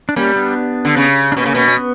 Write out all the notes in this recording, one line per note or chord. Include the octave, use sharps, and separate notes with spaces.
D4
G3 A#3 C#4
B3 D4
D3
C#3
D4
B2 A#3 C#4
C#3
B2
C#4
B3